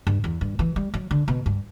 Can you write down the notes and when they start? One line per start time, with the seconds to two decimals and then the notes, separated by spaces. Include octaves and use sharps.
0.07 G2
0.24 E2
0.41 G2
0.59 E3
0.76 G3
0.94 F#3
1.11 D3
1.28 B2
1.46 G2